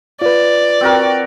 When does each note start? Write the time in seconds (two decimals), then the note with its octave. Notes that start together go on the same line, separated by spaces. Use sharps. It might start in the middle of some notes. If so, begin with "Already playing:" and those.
0.22 F4 B4 D5
0.81 C4 F#4 A#4